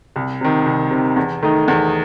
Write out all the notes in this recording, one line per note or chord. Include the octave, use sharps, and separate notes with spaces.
C2
C3 D#3
C2
C3 D#3
E2
D#3 A3 D#4
E2